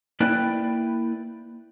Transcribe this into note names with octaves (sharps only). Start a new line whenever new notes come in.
A#3 E4 B4 D5 G5